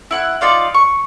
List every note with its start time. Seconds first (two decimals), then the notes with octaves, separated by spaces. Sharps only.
0.11 E4 F#5 F#6
0.41 D#4 F4 D5 F5
0.74 C#6